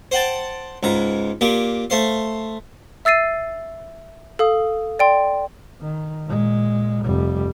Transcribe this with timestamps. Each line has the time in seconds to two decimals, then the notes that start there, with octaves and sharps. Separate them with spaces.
0.11 C5 F#5 G5 A5
0.83 C#2 G#2 A#5
1.41 A#2 A#3 G4
1.90 A3 C5 F5
3.05 E5 E6 A6 C7 D#7
4.39 A4 F5 D#6
4.99 D5 G5 C6
5.81 D#3
6.26 A#2 G#3
7.04 F1 G3